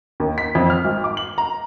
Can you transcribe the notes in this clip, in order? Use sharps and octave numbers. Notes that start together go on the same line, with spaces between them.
D#2
B6
F2
F6
G#1
D6
F#7
A#5